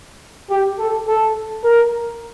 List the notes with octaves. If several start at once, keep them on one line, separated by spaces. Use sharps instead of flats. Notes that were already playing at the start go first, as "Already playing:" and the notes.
G4
A4
A4
A#4